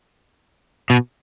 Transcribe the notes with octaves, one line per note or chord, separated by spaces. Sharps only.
B2